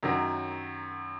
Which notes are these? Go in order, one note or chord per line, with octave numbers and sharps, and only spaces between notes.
F#2 D#3 F#3